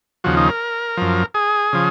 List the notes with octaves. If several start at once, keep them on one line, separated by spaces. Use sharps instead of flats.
D#2 C#3 F3 F#4
D#4
A#4
F#2 F3
G#4
C#3 F3